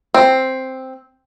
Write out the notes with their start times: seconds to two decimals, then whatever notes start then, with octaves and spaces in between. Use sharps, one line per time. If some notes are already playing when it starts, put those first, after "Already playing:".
0.14 C4